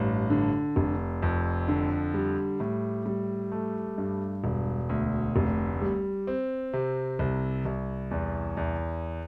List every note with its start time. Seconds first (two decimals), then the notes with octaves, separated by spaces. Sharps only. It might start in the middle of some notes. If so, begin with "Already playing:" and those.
Already playing: A1 G2
0.30 D3
0.76 F1
1.22 F2
1.68 D3
2.14 G3
2.60 A2
3.06 G3
3.52 A3
3.98 G2
4.44 E1
4.89 D2
5.36 F1
5.82 G3
6.27 C4
6.73 C3
7.19 C2
7.65 C2
8.11 E2
8.57 E2